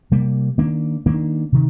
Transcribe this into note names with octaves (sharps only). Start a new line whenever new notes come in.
C3 G3 A#3
D#3 A#3 D4
D#3 A#3 D4
C3 D#3